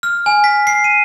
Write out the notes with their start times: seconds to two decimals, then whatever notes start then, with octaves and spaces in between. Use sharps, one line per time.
0.03 F6
0.26 G#5
0.44 B6
0.67 C7
0.84 D#7